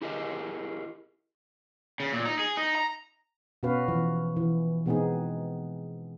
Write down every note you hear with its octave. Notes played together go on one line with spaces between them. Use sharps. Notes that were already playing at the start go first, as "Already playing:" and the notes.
E4 G4 G#4 A#4 D#5
C#3
A#2
D#4
G#4
D#4
A#5
B2 B3 C#4 F#4 B4 F5
E3 F3 B3
E3
B2 G#3 B3 C4 D#4 G#4